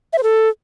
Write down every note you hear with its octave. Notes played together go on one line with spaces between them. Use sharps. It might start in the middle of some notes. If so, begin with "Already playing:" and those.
E5
C5
A4